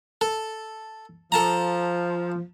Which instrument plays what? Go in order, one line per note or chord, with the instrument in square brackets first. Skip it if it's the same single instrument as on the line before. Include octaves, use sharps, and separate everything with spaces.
[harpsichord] A4
[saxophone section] F3 [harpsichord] A4 A5 A#5